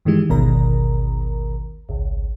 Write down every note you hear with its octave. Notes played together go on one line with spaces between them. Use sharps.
G2 D#3 E3 G#3 G4
G#1 D2 B2 D#3 A#4 A#5
G#1 C#2